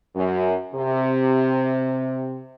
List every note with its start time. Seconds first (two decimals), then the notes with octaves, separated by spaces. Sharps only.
0.15 F#2
0.74 C3